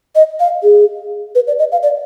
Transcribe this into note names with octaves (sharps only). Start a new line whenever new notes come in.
D#5
F5
G#4
B4
D5
D#5
F5
D5